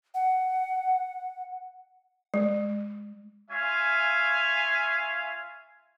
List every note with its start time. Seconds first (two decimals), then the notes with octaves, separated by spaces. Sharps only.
0.14 F#5
2.34 G#3
3.50 C#4 F4 E5 F5 G#5